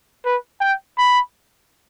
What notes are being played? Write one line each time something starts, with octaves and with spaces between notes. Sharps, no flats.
B4
G5
B5